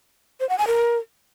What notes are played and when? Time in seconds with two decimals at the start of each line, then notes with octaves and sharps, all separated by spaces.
0.40 C5
0.49 F#5
0.58 G#5
0.67 A#4